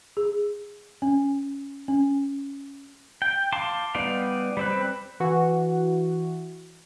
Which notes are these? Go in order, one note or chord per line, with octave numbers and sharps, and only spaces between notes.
G#4
C#4
C#4
G5
F5 A5 C6 D6
G3 B3 D#4 D5 F5
G3 C4 B4
E3 F#4